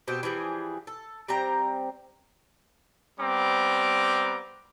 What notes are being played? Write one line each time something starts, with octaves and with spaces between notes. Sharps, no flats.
B2 C4 G4
E3 F3 G3 G#4
A4
G3 C4 G5 A#5
G3 B3 C4 A#5 D6